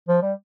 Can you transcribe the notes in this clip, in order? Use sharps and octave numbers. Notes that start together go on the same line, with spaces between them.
F3
G3